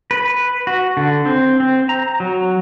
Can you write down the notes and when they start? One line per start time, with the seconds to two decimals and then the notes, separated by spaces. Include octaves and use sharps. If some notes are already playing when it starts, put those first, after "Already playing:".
0.11 B4
0.67 F#4
0.97 D3
1.25 C4
1.60 C4
1.89 A#5
2.20 F#3